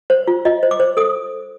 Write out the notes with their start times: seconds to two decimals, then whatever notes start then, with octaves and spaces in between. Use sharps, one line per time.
0.10 C5
0.28 F4
0.45 F4 D#5
0.63 C5
0.71 D6
0.80 C5
0.97 A4 D#6